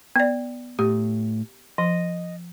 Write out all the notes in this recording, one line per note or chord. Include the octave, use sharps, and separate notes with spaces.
B3 D5
A2 G4
F3 D#5